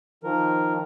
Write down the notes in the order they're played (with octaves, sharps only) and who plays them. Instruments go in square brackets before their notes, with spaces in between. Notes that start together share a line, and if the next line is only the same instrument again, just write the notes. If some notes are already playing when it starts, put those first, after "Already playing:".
[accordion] D#3 F3 A#4